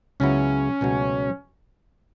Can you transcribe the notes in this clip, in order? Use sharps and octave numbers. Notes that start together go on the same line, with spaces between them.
C#2 C#3 F#3 B3 C#4 E4
C#2 B2 F#3 A3